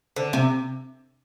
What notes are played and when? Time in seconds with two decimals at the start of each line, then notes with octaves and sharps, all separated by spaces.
0.16 D3 C5
0.33 C3 C4